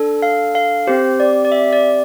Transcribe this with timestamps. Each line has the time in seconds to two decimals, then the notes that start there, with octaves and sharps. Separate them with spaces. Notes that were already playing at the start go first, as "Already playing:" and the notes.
Already playing: D4 A4
0.22 F5
0.55 F5
0.87 C4 G4 C5
1.20 D5
1.45 D5
1.52 E5
1.73 D5